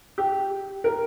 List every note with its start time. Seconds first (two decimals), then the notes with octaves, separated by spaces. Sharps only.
0.18 G4
0.84 A#4